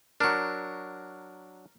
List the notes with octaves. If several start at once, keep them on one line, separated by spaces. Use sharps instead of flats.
F#3 D4 A#4 C#6